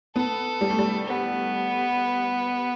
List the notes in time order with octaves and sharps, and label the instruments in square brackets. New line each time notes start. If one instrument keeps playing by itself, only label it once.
[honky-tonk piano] B3 [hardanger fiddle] A4
[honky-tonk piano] G3
A3
G3
[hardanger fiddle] B3